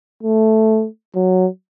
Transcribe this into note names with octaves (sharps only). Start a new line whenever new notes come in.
A3
F#3